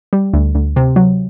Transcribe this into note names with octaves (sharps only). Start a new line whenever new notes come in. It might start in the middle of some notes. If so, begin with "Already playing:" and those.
G3
D2
D2
C3
F#3